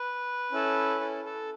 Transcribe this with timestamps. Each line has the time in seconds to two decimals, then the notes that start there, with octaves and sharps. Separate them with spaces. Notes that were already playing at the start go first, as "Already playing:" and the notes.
Already playing: B4
0.52 C#4 E4 A4
1.01 A4
1.25 A4